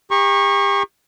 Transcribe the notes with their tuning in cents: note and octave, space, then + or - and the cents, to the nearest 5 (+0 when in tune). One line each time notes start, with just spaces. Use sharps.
G4 +35 A#5 +20 C#6 -15